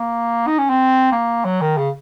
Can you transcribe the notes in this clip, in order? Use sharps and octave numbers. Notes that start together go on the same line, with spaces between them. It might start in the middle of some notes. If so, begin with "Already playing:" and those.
Already playing: A#3
D#4
C#4
C4
A#3
F#3
D#3
C#3